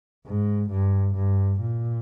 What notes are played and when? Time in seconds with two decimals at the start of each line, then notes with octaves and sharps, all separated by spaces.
0.26 G#2
0.70 G2
1.15 G2
1.60 A#2